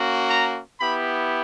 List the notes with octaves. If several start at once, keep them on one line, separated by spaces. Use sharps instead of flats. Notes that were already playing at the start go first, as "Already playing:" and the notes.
Already playing: A#3 C#4 F#4
A#5
B3 E4 G4 B5